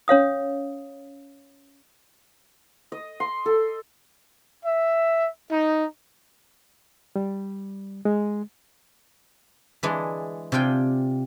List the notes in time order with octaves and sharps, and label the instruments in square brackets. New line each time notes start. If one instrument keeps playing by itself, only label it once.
[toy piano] C#4 C#5 F5 D#6
[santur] D#5
C6
A4
[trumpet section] E5
D#4
[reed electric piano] G3
G#3
[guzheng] E3 G#3 D4
C3 D4 F4 G5 G#5